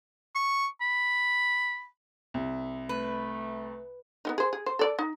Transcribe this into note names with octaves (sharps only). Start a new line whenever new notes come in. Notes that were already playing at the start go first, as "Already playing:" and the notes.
C#6
B5
C2
A3 B4
B3 C#4 D#4
G#4 C5
G#4
C5
A4 D5
D#4